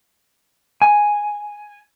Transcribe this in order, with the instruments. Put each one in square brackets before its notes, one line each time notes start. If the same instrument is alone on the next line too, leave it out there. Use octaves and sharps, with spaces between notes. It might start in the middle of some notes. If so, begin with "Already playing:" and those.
[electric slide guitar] G#5